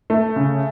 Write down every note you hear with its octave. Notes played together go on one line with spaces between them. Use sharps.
A3
C#3